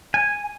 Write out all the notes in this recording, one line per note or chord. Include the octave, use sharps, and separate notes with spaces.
G#5